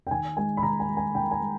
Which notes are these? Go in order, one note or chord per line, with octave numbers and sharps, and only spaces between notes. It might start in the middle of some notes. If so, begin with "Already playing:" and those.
G5
D#3 G#5
G#3 G#5
B5
D#3 A#5
G#5
G#3
G#5
D#3 G5
G#5
G#3